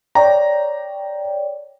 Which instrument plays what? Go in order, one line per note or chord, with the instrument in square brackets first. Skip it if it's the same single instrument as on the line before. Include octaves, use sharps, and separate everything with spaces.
[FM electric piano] C#5 D5 G5 [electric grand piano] A#5